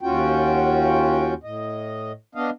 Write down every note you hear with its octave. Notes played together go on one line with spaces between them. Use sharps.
D#2 C#4 F4 F#4 G5
A2 D#5
B3 D4 D#5 F5